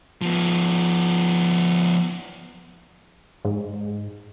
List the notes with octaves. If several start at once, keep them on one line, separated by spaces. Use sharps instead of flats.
F3 B3
G#2